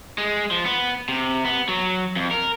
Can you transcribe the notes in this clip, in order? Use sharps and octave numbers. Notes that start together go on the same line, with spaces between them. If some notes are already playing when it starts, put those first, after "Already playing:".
G#3
F3
B3
C3
B3
F#3
F2
A#4